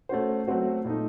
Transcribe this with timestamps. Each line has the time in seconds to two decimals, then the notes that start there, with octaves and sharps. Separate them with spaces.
0.09 A3 C#4 F#4 C5
0.47 F#3 A3 C4 F#4
0.85 A#2 A3 D#4